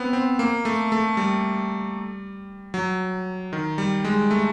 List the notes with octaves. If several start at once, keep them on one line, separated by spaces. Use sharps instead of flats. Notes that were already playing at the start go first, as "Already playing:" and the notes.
Already playing: B3 C4
C4
A#3
A3
A3
G3
F#3
D#3
G3
G#3
A3